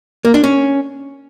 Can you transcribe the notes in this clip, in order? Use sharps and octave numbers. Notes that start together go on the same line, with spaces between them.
A#3
D4
C#4